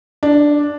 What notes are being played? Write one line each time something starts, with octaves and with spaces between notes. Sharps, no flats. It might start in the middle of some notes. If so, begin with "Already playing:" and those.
D4